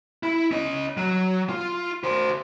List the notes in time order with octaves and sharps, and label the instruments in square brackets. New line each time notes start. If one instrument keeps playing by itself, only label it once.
[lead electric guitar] E4
C#4 D#5
F#3
F4
F#4 C5